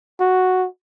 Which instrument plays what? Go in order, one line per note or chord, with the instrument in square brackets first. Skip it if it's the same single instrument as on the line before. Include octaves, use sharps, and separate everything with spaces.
[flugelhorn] F#4